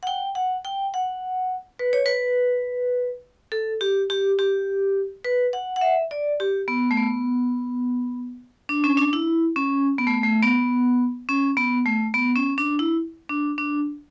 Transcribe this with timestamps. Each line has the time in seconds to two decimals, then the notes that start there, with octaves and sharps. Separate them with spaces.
0.03 F#5
0.07 G5
0.35 F#5
0.65 G5
0.94 F#5
1.79 B4
1.93 C#5
2.06 B4
3.52 A4
3.81 G4
4.10 G4
4.39 G4
5.25 B4
5.53 F#5
5.76 F#5
5.81 E5
6.11 D5
6.40 G4
6.68 B3
6.91 A3
6.97 B3
8.69 D4
8.84 C#4
8.97 D4
9.13 E4
9.56 C#4
9.99 B3
10.07 A3
10.23 A3
10.43 B3
11.29 C#4
11.57 B3
11.86 A3
12.14 B3
12.36 C#4
12.58 D4
12.79 E4
13.29 D4
13.58 D4